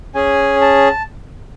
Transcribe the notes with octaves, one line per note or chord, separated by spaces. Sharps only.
C#4 G#4 G#5
A5